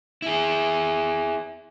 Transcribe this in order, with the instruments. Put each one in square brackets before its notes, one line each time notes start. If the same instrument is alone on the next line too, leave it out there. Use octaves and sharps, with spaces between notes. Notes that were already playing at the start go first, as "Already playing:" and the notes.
[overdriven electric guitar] E4 G#4